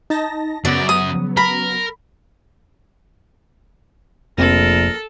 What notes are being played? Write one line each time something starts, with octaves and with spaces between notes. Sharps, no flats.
D#4 A5 A#6
F#2 C#3 F#3 B3 D5
D#6
A#4 B5
F1 A#1 C4 A4 A#4